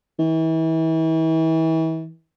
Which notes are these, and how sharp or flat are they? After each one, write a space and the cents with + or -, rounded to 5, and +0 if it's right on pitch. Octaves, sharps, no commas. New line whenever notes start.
E3 -35